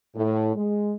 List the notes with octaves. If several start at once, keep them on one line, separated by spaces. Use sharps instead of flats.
A2
G#3